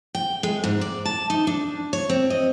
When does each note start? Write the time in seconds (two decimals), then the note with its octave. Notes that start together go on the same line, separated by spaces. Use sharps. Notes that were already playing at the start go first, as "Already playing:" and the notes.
0.15 G5
0.43 G#3
0.64 G#2
0.81 D5
1.05 A5
1.30 D#4
1.47 D4
1.93 C#5
2.10 C4
2.30 D#5